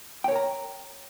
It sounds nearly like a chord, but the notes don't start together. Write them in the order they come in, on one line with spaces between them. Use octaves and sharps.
G5 C#5 A#4 A#5